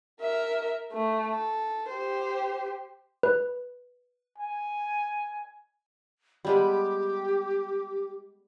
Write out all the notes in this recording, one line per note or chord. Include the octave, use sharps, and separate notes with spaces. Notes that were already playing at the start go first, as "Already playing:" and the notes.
A#4 E5
A3
A4
G4 C5
B4
G#5
G3 G#3 B3 G4